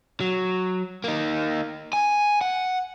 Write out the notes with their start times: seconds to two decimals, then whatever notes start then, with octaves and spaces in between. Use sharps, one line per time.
0.21 F#3
1.04 A#3 D#4
1.93 G#5
2.41 F#5